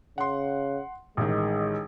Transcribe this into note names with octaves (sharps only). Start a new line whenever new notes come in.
C#3 F#5 C6
A1 D#3 G#3